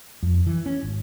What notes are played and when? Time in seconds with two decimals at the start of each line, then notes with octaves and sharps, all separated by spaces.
0.23 F2
0.47 E3
0.66 C#4
0.83 G#1